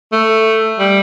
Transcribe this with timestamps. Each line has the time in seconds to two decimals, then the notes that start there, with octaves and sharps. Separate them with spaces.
0.12 A3
0.79 G3